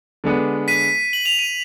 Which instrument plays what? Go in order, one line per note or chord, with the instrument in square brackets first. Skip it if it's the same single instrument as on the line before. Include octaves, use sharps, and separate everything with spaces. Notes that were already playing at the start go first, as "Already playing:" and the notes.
[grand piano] D3 G#3 B3 D4
[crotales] B6 D#7
F#7
F7
D#7